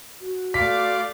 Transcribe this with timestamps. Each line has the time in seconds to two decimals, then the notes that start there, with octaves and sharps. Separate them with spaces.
0.20 F#4
0.54 A3 D5 F5 C6 D6 B6